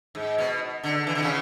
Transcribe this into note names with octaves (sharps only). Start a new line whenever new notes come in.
G#2
B2
D3
E3
D3
C#3 E3